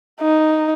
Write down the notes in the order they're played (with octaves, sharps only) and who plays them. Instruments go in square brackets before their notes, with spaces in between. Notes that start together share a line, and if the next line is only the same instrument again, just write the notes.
[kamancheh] D#4